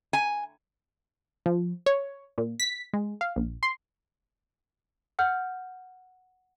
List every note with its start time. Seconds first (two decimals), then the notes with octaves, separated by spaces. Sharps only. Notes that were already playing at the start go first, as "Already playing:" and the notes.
0.13 G#5
1.46 F3
1.86 C#5
2.38 A#2
2.60 B6
2.93 G#3
3.21 F5
3.36 A#1
3.63 C6
5.19 F#5 F6 G6